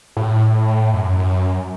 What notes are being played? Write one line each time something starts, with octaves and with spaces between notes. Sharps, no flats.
A2
F#2